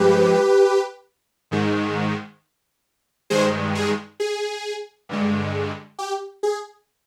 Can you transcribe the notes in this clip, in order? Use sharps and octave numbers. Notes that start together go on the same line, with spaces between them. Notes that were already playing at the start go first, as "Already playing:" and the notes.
Already playing: G2 F3 G#3 G4 B4
G#2 D#3 G#3
G2 D#3 G#3 G#4 C5
G#4
G#4
G2 D3 G#3
G4
G#4